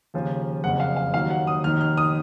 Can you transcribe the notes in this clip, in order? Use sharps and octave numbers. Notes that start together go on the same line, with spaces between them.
D#2 C#3 F3
F#1 F2 C#3 F#5
F5
F5
D#2 D#3 F#3 F5
F#5
D#6
F1 D#2 D#3 F6
F6
D#6